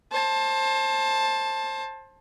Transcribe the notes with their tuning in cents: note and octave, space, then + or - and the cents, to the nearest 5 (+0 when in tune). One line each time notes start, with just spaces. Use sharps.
C5 +30 A5 +0